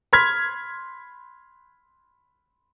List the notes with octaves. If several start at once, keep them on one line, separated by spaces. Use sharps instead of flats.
B5 C6 F6 G#6 B6